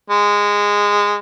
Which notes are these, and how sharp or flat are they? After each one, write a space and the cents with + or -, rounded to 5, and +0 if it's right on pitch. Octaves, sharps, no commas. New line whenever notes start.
G#3 -15